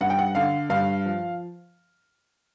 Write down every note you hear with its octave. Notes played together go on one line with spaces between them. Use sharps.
G2 F#5
G5
F#5
D3 F5
G2 F5
F3